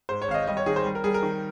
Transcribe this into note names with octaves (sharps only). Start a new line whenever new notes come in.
G#2 C5
C#5
G#1 F5
D#5
G3 D#5
C#5
D#3 G#4
C5
G3
A#4
G3 G#4
A#4
D#3